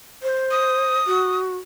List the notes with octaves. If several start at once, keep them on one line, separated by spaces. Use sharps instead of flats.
C5
D#6
F#4